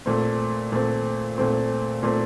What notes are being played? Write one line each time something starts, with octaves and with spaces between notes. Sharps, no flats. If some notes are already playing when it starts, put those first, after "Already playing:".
A#2 A3 C4
A#2 A3 C4
A#2 A3 C4
A#2 A3 C4